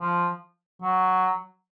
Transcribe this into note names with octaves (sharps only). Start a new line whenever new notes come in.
F3
F#3